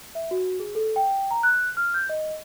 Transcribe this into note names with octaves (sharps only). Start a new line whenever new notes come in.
E5
F#4
G#4
A4
G5
A#5
F#6
F6
G6
D#5